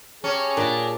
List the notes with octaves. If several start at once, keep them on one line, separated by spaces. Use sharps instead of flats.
C#4 G4 G#4 A5 A#5
A#2 D4